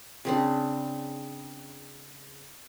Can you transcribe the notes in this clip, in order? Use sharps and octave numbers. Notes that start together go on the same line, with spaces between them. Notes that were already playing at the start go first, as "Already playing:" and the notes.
C#3 C4 D4